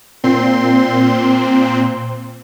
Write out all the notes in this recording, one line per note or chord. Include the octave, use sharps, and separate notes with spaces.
A#2 C4 C6